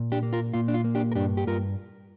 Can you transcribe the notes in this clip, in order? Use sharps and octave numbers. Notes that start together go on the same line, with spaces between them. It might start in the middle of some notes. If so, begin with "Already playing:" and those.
Already playing: A#2
D4 G4
A#3
F4 A#4
A#2 F4
D4
F4
A#3
D4 G4
A#4
G2 D4 G4
G4
G2 F4 A#4